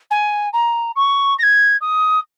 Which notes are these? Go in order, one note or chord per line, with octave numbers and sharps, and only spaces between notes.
G#5
A#5
C#6
A#6
G#6
D#6